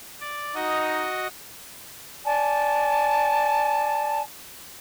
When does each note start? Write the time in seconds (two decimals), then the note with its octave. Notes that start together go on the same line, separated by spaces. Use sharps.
0.21 D5
0.55 D#4 F#4 D#5
2.25 D5 G#5 A5